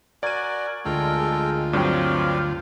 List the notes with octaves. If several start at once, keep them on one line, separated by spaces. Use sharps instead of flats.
F#4 A#4 D5 G#5 D#7
D2 G#3 F4 A4 A#4 G5
G2 F#3 C4 C5 D5 F5 G5